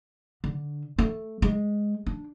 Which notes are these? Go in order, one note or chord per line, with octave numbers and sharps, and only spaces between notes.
D3
A3
G#3
D4